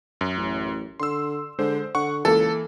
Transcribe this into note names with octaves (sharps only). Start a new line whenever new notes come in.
F#2
A1
D3 C6 E6
D3 G#3 C5
D3 F#5 C#6
C#2 E3 A#3 A4